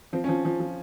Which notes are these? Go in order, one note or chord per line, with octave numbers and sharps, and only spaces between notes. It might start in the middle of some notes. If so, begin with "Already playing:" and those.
F3 C4
C#4
F3
F3
F3